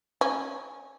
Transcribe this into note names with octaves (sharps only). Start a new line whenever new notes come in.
C#4